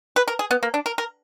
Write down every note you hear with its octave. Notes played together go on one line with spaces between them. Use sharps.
B4
A#4
G#4
B3
A#3
D4
A#4
A#4